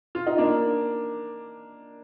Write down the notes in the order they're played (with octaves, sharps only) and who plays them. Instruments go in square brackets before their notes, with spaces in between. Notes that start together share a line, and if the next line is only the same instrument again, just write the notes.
[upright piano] F4
D#4
A#3 D4